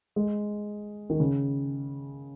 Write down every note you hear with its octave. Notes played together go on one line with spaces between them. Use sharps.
G#3
D#3
C#3